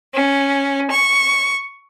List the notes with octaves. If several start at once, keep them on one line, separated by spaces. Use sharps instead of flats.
C#4
C#6